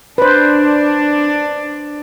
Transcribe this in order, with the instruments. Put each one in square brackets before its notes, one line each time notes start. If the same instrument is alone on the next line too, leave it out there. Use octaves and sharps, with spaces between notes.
[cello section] D4 [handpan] B4 C5